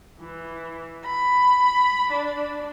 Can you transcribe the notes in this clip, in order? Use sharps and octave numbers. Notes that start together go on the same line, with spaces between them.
E3
B5
D4